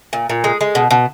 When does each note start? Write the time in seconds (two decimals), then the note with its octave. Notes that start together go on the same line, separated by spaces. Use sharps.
0.13 A#2
0.30 A#2
0.44 G#3
0.61 G#3
0.75 B2
0.91 B2